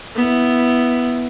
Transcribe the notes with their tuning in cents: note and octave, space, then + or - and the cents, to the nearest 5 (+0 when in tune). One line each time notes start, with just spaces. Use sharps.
B3 +0 E4 +0